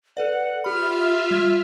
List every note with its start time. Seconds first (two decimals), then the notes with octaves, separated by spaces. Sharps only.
0.17 A4 B4 D5 F#5
0.64 F4 G4 E5 F5 B5 F6
1.31 G3 G#6